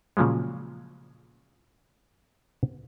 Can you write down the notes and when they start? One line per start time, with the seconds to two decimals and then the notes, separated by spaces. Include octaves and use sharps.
0.17 A#2 C#3 F3 F#3 G#3